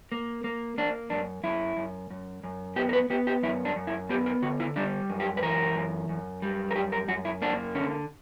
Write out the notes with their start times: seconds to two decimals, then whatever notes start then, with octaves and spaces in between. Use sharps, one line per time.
0.12 A#3
0.44 A#3
0.78 A#3 D4
1.10 F#2 D4
1.43 F#2 E4
1.77 F#2
2.10 F#2
2.44 F#2
2.76 B3 G4
2.89 A#4
2.93 B4
3.10 B3 G4
3.27 G4
3.43 F#2 E4
3.65 D4
3.76 F#2
3.87 E4
4.09 B3 G4
4.26 A#4
4.42 D3 F#4
4.60 E4
4.76 G3 D4
5.10 F#2
5.20 G4
5.37 B4
5.42 E3 A#4
5.75 F#2
6.09 F#2
6.42 G3
6.71 A#4
6.75 F#2 G4
6.92 A#4
7.08 F#2 F#4
7.25 E4
7.41 A#3 D4
7.75 D3 C#4